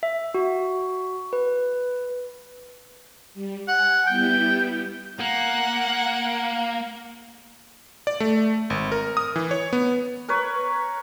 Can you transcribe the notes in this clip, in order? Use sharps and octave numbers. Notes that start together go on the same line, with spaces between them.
E5
F#4
B4
G3
F#5 G#5
G3 B3 E4 G5
A#3 F#5
D5
A3
G#1
A#4
D#6
E3
C#5
B3
A#4 B4 C#5